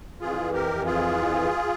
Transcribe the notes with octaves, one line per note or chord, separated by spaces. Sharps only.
F2 E3 F4 G#4
G4 A#4
F4 G#4